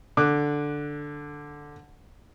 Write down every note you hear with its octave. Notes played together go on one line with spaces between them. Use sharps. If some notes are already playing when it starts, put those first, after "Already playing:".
D3 D6 F#6